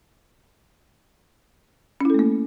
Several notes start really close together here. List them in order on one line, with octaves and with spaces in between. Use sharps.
C#4 E4 A4 A3 A#3